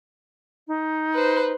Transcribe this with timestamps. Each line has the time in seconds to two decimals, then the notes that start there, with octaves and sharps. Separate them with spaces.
0.68 D#4
1.15 B4 C5